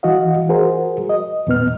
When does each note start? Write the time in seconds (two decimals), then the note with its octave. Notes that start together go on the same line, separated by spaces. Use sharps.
0.03 E3 F#4 D#5 F5
0.49 F#4 G#4 A#4 C5
1.09 D#5
1.47 E2 A#2 B3 F6